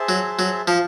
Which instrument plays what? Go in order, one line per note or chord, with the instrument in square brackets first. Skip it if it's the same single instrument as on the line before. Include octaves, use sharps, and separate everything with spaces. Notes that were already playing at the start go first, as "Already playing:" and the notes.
Already playing: [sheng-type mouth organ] G#4 C5 E5 A5
[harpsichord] F#3
F#3
F3